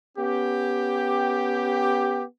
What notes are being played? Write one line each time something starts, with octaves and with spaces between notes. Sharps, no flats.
B3 C#4 G4